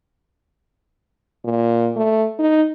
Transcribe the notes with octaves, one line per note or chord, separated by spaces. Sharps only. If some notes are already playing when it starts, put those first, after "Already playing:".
A#2
A3
D#4